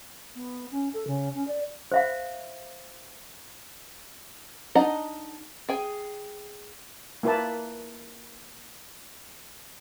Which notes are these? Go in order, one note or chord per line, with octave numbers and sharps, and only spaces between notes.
B3
C#4
A4
C#3
C#4
D5
C5 E5 F5
D4 D#4 D#5 F#5 A#5
G#4 G5 G#5
A#3 E4 B4 A5